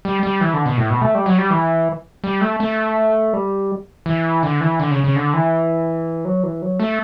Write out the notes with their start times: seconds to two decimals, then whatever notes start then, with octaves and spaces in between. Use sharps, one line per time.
0.05 G3
0.23 G3
0.41 E3
0.53 D3
0.66 B2
0.77 A2
0.90 B2
1.01 A3
1.15 G3
1.26 F#3
1.38 G3
1.50 E3
2.24 G3
2.41 A3
2.60 A3
3.33 G3
4.06 E3
4.43 D3
4.61 E3
4.80 D3
4.91 C#3
5.04 C#3
5.16 D3
5.33 E3
6.25 F#3
6.43 E3
6.62 F#3
6.80 A3